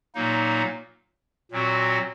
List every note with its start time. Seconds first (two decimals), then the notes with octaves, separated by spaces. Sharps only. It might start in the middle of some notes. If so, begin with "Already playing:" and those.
0.15 A#2 F#3 A#3 D#4
1.52 A#2 F#3 C4 F#4